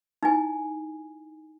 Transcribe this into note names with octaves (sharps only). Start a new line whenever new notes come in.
D#4 E4 G#5